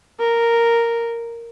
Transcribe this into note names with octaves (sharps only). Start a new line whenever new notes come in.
A#4